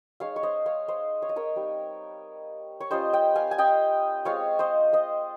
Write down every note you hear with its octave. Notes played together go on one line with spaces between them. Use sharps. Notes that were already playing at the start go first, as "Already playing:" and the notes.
G#3 D#4 C#5 F5
C#5
C5 D#5
C#5 F5
C5 D#5
C#5
D#5
A#4 C#5
G3 C4 D#4
C#5
G3 C#4 F4 C5 D#5
D#5 G5
F5 G#5
G#5
D#5 G5
G#3 C4 F4 C#5 F5
C5 D#5
C5 D#5